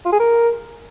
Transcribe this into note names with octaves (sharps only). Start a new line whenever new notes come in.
F4
G#4
A#4